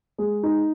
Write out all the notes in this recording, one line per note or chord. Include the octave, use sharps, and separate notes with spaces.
G#3
D#4